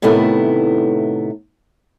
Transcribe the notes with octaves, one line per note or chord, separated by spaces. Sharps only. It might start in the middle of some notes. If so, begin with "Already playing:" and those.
A2 C3 D#3 A3 B3 E4